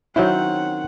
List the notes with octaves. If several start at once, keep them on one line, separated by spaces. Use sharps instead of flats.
D#3 F#3 C4 C#4 E4 F#5